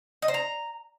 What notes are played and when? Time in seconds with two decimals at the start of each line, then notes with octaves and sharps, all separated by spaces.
0.22 D#5
0.28 C5
0.34 A#5